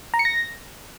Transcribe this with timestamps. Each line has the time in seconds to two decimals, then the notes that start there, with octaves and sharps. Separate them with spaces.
0.14 A#5
0.19 C#7
0.25 A#6